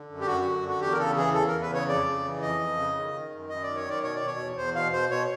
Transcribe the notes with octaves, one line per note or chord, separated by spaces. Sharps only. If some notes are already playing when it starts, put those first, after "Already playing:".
Already playing: D3
F#2
G4
F#2 F#4
D3
D3
F#4
E2 G4
A#4
C#3 A4
E3 G#4
E2 A4
A#4
E2
B4
C#3 C#5
F2 D5
C#3
E3
F2 D#5
F2
C#3
D#3
D#3
F#2
F#2 D#5
D#3 D5
C#5
D#3 D5
B2 C#5
D5
B2
C#5
E2
E2 C5
B2 F5
B2 C5
B2 C#5